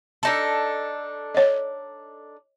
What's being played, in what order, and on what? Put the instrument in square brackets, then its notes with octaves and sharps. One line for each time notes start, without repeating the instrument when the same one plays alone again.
[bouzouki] D4 D#4 A4
[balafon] C#5 D#5